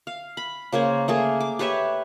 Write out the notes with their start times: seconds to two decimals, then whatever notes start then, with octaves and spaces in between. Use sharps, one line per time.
0.07 F5
0.37 B5
0.72 C#3 A#3 C5 C#5
1.08 A3 A#3 G#4
1.41 D6
1.59 G4 B4 C#5 E5